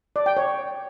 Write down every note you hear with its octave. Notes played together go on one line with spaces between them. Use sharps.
D5
G5
C#5